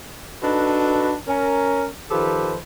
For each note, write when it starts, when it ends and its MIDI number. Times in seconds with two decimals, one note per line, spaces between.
0.42 1.14 62
0.42 1.14 63
0.42 1.14 66
0.42 1.14 69
0.42 1.14 71
1.28 1.87 61
1.28 1.87 70
2.11 2.56 51
2.11 2.56 53
2.11 2.56 67
2.11 2.56 69
2.11 2.56 71
2.11 2.56 72